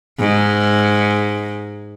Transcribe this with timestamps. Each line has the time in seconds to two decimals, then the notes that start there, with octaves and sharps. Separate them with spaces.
0.20 G#2